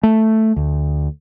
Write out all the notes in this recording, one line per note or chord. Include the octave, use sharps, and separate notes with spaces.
A3
D2